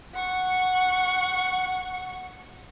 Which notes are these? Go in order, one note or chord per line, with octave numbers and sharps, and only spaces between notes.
F#5 C#6